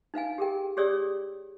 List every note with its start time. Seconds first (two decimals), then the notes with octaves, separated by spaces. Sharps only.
0.14 D#4 B4 F5 G#5
0.38 G4 G#4 A#4 G5
0.77 G4 G#4 C#5 D5 D#6 E6